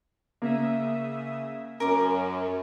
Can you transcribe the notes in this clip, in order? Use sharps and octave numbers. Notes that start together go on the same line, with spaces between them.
C#3 A#3 E5 D#6
F#2 C#4 A#4 D6